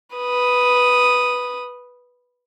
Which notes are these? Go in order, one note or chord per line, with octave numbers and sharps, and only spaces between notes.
B4 D#6